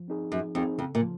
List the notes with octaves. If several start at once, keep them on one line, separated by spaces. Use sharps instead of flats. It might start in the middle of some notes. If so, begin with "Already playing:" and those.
Already playing: F3
C4 D#4 G#4
F#2 F3
F2 C4 D#4 G#4
F2 C#3
A#2
F3